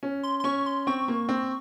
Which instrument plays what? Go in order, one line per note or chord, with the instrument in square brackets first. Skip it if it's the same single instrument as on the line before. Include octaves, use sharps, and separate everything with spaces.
[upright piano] C#4
[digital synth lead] C6
C6
[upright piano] C#4 [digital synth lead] C#6
[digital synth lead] C6
[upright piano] C4 [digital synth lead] C#6
[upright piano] A#3
C4